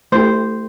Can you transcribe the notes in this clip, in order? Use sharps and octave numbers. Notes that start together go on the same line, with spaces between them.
A3 E4 G4 C5